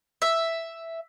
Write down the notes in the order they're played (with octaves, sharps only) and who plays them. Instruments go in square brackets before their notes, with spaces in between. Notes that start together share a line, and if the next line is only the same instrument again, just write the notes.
[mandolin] E5